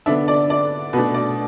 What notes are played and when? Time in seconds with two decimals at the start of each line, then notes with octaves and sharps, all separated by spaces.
0.06 D3 B3 D4 E5
0.28 D5
0.50 D5
0.93 B2 B4
0.96 A3 D4
1.14 D5